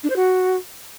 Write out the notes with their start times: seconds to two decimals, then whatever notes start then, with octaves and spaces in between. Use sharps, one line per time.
0.03 D4
0.09 C5
0.16 F#4